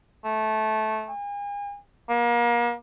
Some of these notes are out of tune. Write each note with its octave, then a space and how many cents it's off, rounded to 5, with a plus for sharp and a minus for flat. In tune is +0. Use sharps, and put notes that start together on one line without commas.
A3 -15
G#5 -40
A#3 +35